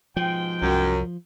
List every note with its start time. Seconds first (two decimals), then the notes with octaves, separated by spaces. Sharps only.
0.17 G#2 B2 F3 G5
0.62 C2 F#2